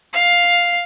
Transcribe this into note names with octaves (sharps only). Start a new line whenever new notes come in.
F5